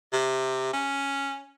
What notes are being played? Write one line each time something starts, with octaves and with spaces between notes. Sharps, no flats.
C3
C#4